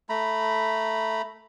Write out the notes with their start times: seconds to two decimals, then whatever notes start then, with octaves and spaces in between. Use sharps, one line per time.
0.09 A3 A#5 B5